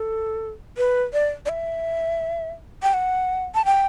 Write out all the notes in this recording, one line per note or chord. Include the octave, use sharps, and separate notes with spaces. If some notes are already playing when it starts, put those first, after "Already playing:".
Already playing: A4
B4
D5
D5
E5
G5
F#5
A5
G5